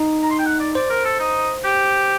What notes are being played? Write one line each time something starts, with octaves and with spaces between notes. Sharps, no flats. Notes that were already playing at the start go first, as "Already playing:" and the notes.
Already playing: D#4
A#5
C6
G5
F#5
D5
C5 D5
A#4
A4
D#4
G4